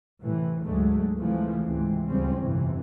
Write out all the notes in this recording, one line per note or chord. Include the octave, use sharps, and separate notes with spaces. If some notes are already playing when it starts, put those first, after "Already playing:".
A2 C3 E3
D2 G#2 D3 F#3 G#3 A3
C3 E3 F3 G#3 A3
C#2 G#2 C3 E3 C4
D2 C#3 F3 G3 C4 C#4
G1 F2 C3 E3